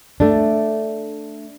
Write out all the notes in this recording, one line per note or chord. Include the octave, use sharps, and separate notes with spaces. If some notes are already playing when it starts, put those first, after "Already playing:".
A3 D4